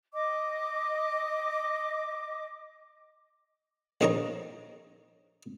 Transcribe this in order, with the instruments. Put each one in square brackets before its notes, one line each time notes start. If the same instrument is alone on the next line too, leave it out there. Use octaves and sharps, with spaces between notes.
[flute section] D#5 D6
[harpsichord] A#1 C4 D#4 A#4 C#5 A#5